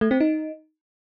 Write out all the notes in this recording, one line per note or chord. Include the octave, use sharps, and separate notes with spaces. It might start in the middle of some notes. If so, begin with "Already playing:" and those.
A3
C4
D#4